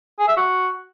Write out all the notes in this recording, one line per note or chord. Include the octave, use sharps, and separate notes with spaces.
G#4
E5
F#4